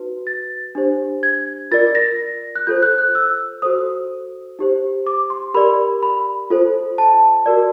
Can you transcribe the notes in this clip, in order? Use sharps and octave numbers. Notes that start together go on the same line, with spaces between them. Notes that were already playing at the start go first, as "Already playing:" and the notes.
Already playing: D#4 F#4 B4
A6
D4 G4 C5
G#6
F4 A#4 D5 A6
A#6
F#6
F4 A4 C5 G6
F#6
F#6
E6
F#4 A4 C5 D#6
D#4 G4 C5
D6
C6
G4 A#4 D5 B5
B5
F4 A4 C5
A5
F#4 A#4 D5